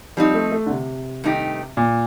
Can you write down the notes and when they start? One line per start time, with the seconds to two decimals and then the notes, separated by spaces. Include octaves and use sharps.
0.17 F3 G3 C4 D#4
0.35 A3
0.52 A3
0.66 D3
0.70 C3
1.24 G2 D#3 A3 D#4 G4
1.77 A#2